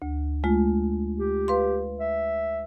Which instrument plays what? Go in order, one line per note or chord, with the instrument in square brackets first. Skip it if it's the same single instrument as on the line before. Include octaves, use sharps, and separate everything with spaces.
[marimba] D2
G#3 A3 F4
[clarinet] G4
[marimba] B4 F5 C6
[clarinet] E5